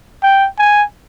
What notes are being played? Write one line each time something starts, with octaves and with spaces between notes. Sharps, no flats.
G5
G#5